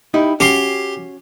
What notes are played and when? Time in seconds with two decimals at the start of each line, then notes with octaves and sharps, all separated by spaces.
0.14 D#4 E4 G4
0.40 C#4 F#4 G4 C6